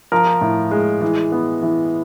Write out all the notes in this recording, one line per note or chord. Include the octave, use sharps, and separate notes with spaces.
F3 A#4
A2
G#3
E3
B3
E3